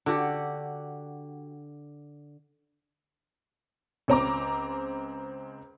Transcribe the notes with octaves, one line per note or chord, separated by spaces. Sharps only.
D3 F#4 G4
C#2 C4 A#5 D6